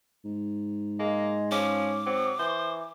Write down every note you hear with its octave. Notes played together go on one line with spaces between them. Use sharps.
G#2
G#3 A#3
F3 C#4 D6
F#3 C4
E3 C5